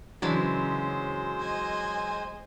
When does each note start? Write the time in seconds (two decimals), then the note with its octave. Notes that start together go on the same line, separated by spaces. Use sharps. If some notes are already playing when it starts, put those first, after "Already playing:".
0.22 C#3 E3 F#3 G#3 D4 E4 C5
1.40 D#5 G#5